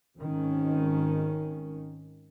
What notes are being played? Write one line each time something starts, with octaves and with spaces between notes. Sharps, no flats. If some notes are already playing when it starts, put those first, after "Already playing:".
G#1 D#3 C#4